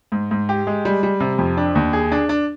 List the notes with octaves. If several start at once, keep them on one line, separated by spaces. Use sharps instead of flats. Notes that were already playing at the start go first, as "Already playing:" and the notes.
G#2
G#2
G4
G#3
G3
G3
C3
F2
D4
D#2
G#4
D4
D4